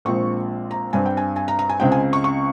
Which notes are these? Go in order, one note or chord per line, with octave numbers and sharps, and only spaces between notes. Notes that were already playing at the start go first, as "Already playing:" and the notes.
A#1 A#2 G#3 C4 C#6
A#5
G2 G3 C4 G#5
G5
G#5
G#5
A#5
A#5
G#5
C#2 C#3 G#3 C4 G5
G#5
C#6
C#6